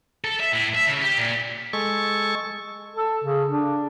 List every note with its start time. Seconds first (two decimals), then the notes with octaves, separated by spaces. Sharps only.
0.24 A4
0.40 E5
0.53 A2
0.75 E5
0.88 C#3
1.02 G4
1.18 A#2
1.73 G#3 A4 C#6
2.97 A4
3.24 C#3
3.48 D4